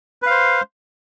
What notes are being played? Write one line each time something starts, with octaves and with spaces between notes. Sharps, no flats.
B4 C5 F5